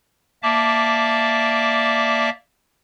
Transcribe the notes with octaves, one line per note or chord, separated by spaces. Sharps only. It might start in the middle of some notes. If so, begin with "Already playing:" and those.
A#3 D5 E5 A5 D6